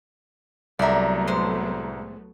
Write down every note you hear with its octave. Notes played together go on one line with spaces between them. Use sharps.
C2 F#3 A3 B3 D5 E5 A#5
A2 G#3 C5